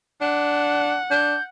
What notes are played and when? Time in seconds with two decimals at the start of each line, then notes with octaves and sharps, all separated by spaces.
0.21 D4 F#5
1.10 D4 G6